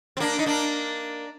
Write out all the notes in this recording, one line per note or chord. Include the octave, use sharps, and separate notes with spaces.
C4
A#3 D4
D#4
A#3 D4